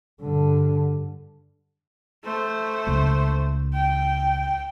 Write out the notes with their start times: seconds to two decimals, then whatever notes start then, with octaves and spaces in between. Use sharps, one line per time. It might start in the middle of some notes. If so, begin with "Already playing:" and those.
0.22 G2 D3
2.24 A3 C5
2.87 C#2 C#3
3.73 G5